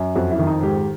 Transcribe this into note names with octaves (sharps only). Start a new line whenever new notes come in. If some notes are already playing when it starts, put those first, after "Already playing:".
Already playing: F#2
F2 F#4
E4
D#3
D#4
G#2 G4